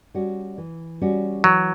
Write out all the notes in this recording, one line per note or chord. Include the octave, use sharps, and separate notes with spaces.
G3 C#4 F#4
E3
G3 C#4 F#4
E3 F#3